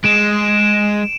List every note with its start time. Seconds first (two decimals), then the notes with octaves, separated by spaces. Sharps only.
0.04 G#3 D7 E7